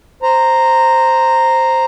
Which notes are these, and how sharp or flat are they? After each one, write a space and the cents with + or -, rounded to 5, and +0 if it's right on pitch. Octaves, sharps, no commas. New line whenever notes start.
C5 +0 A#5 -5